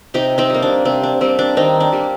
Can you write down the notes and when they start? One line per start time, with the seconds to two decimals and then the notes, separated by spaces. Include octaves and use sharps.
0.14 C3 D#4 G4
0.38 C4 D#4
0.50 G3 A#3
0.62 D4
0.85 C3 C4
1.03 D4
1.21 G3 A#3 C4
1.39 D4
1.56 D#3 C4 D#4
1.80 D4
1.92 G3 A#3